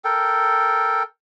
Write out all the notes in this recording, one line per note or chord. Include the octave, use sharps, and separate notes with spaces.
A4 A#4 G5